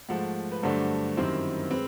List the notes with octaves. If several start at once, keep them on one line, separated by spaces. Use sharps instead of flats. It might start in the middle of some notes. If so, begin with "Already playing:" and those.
G#2 F3 A3 F#5
B4
G2 D3 F#3 A3 D4 C5
F#2 D#3 G3 C4 E4 C5
G#3 C4 B4